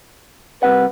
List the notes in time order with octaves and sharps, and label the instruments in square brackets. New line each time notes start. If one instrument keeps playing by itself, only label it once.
[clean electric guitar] C2 C3 F#5 [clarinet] B4